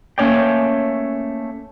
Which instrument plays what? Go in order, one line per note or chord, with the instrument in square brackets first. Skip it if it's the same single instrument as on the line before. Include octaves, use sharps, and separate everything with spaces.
[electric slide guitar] A3 A#3 C#4 C#5 D5 G5